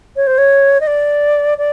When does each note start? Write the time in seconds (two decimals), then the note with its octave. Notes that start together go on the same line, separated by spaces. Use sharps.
0.16 C#5
0.26 C5
0.38 C#5
0.80 D#5
0.87 D5
1.58 D5